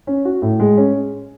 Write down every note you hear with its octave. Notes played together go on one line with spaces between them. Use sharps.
C#4
F#4
A2
G#3
C#4